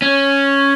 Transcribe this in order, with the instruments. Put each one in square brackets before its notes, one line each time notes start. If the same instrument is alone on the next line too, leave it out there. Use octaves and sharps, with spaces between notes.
[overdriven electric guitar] C#4